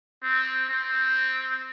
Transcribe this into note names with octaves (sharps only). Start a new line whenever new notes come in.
C4
C4